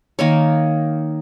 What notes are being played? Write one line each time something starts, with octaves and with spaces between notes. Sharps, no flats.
D#3 A#3 C#5